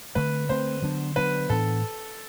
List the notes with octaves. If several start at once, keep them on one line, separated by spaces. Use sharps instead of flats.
D3 A3 C4 B4
D3 A3 C4 C5
D3 F#3 B3 D4
D3 F#3 B3 D4 B4
A2 E3 B3 D4 A4